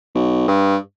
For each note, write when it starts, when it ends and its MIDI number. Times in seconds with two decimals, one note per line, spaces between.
0.15 0.43 35
0.48 0.76 43